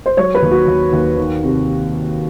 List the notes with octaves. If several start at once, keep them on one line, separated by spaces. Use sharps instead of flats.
C5
F#3 C#5
B4
D#2
F#4
D#2
D#2
D#3
C3